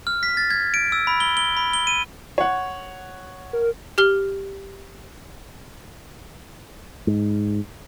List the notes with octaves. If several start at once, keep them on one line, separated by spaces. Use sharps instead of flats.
F6
B6
A6
G#6
D7
E6
B5
G7
G7
B5
G7
D#7
C#5 F#5
A#4
G4 F6 G7
G#2